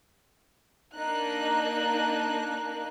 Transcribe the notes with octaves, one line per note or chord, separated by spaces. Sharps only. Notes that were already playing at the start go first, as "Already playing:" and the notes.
A#3 D4 D#4 F#6